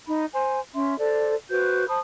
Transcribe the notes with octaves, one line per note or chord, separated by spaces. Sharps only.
D#4 B5
C5 G#5
C#4 E5 C6
A4 C5 D5
F#4 B4 C5 G6
C5 A5 B5 D#6